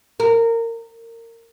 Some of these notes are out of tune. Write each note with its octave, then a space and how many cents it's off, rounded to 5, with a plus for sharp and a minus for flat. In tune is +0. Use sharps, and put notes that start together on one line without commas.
A#4 -25